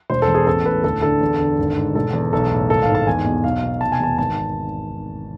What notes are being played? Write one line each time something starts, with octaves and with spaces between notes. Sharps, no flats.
E1 C5
A4
E2
G#4
A1 A4
A2 B4
D2 A4
D3 A4
E2
D3
G#1
G#2
E1 A4
E2
B1 A4
A2
G#1 A4
F5
G#2
A5
E2 G#5
B2
B1 F5
B2
F1 A5
G#5
E2 A5
G#1 A5